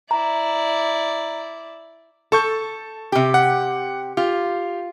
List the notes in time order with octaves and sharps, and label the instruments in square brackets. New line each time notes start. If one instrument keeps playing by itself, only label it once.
[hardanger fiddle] E4 D5 [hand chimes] A#5
[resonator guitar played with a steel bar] A4 [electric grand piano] A5 C#6 G6
[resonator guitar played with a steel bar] C3 G4
[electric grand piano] F#5
[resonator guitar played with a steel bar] F4 [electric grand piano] G4